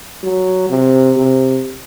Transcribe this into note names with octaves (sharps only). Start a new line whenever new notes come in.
F#3
C3
C3